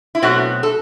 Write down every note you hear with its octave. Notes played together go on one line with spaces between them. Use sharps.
E4
B2 F#3 A3 C4 F#4
A4